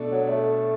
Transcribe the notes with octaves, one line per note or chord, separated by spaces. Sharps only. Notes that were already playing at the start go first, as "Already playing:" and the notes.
Already playing: B2 A3 D4 A4
F#3
A3